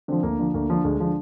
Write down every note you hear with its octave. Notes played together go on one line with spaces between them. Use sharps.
D3 F3 C4
D2 A#3
D3 F3
D2 A#3
D3 F3
D2 G#3
D3 F3